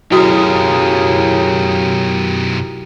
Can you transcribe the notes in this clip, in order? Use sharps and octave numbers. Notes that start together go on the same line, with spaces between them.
B1 F#2 C#3 E4 F#4 G4 A#4 D#6